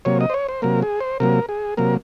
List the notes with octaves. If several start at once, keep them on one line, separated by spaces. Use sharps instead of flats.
C3 F#3 A#3 C#5
D#5
C5
C#5
C5
C3 F#3 A#3 A#4
G#4
C5
C3 F#3 A#3 A#4
G#4
C3 F#3 A#3 A#4